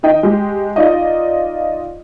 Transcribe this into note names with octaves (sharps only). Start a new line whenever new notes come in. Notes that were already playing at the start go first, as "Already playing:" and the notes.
D#3 D#4 D#5 G5
G#3 G4
D#4 F4 D5 D#5